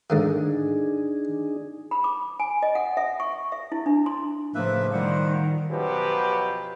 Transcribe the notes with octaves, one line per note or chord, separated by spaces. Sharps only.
G#2 D3 D#3 D4 D#4 G#4
B5
D6
G#5
D#5
F#5
E5
C#6
E5
E4
D4
C6
A2 C#3 F3 A#3 B4 E5
D#3 F3 G3 C5 F#5
F#2 B2 F3 F#3 G4 B4